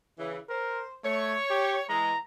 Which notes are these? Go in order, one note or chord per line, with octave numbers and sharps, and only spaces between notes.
C#3 E3
A#4 C5
A3 C#5
G4
E3 G#3 A#5